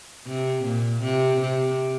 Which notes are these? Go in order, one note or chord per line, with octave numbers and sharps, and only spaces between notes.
C3
A#2
C3
C3